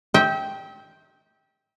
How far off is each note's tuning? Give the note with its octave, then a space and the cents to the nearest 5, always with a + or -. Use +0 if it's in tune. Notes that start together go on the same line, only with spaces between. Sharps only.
E5 -35 G5 +0